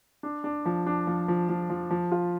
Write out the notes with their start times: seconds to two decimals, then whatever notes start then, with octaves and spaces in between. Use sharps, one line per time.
0.23 D4
0.44 D4
0.65 F3
0.86 D4
1.07 F3
1.28 F3
1.49 F3
1.70 F3
1.90 F3
2.12 F4